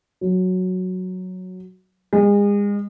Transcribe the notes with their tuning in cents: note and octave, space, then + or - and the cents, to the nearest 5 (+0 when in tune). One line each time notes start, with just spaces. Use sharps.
F#3 -5
G#3 -35